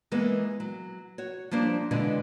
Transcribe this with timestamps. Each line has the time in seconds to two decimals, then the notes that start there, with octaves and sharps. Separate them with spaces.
0.11 E3 G#3 A#3 B3
0.60 F#3
1.18 F#4 C#5
1.51 F3 G3 A#3 D4 C5
1.91 B2 D3 E3 G#3